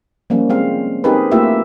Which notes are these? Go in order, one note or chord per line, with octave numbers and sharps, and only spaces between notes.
F3 G3 A#3 C#4
G#3 C4 F5
C4 D#4 G4 G#4 A#4 B4
A3 A#3 E4 F4 G4 E5